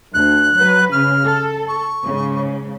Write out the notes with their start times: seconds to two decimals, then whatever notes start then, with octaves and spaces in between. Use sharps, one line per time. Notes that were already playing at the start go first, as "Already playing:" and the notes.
0.14 D2 F#6
0.58 F#3 B4
0.92 C#3 F6
1.25 A4
1.68 C#6
2.04 G#2 C#3